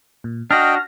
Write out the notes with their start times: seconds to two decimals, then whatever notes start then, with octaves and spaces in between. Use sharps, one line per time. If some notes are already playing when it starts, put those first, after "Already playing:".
0.24 A#2
0.51 D4 F#4 D#5 G5 F6 A#6